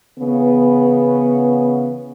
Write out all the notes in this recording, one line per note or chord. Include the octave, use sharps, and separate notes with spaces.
C#3 E3 B3